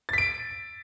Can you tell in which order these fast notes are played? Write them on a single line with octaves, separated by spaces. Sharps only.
A6 B6 D7